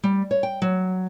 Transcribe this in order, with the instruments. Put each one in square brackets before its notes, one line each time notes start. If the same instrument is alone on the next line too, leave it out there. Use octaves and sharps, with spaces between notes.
[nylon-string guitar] G3
C#5
G5
F#3